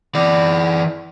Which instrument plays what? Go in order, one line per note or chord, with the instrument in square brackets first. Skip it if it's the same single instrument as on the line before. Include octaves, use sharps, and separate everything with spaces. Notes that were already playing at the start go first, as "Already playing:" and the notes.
[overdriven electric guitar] E3 D5